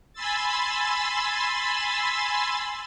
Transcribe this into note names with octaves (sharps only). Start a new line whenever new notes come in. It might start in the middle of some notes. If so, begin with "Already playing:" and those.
G#5 B5 C6 E6 A6